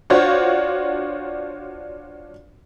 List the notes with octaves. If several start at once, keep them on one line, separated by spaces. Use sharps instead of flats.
D4 F4 F#4 C5 C#5